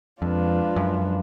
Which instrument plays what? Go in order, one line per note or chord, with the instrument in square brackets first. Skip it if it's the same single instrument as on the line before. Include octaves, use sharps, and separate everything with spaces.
[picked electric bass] F2 [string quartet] F3 G#3 D4 F4 B4
[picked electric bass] F#2